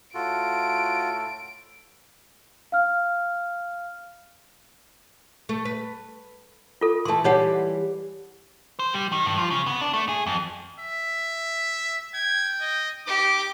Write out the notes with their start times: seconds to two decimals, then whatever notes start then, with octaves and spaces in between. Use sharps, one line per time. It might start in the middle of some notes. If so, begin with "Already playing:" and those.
0.14 A2 F4 F#4 A4 D7
2.72 F5 F6
5.49 A3
5.65 B4
6.81 F4 A4
7.05 E3 A3 A5 C6
7.24 E3 G3 D#4 G4 C#5 F#5
8.79 C5
8.93 G3
9.12 D#3
9.26 G2
9.38 F3
9.50 C#3
9.67 B3
9.81 D4
9.93 A3
10.09 G#4
10.26 F2
10.79 E5
12.14 G5 G#6
12.61 D#5
13.07 D#4 G4 D6